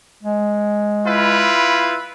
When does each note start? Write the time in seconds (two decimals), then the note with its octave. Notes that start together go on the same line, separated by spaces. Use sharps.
0.23 G#3
1.07 E4 F4 B4